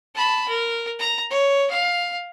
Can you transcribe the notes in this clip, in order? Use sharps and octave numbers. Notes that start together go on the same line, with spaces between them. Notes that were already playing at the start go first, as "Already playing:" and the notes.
A5 B5
A#4
A#5
C#5
F5